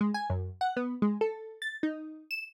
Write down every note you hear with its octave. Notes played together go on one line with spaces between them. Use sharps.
G#3
G#5
F#2
F#5
B3
G#3
A4
A6
D#4
E7